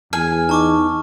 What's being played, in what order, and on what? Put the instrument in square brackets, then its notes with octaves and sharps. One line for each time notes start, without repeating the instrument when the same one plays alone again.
[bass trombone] E2 [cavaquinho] G#5 [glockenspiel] F6
[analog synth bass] D#4 [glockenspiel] A5 C#6 D6